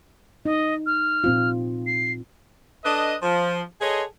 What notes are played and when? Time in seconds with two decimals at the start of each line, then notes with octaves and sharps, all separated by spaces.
0.45 D#4 D#5
0.86 F6
1.24 A#2 C4 F4
1.87 C7
2.85 D4 A4 B4 D#5
3.23 F3
3.81 G#4 A4 B4 C#5 D#5 C6